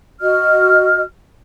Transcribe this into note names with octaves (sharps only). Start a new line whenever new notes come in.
F#4 D#5 F6